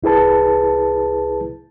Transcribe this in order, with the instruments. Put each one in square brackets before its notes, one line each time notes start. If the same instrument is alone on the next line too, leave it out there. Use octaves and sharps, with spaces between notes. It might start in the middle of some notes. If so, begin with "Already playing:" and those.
[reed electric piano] C2 E4 G#4 B4 A5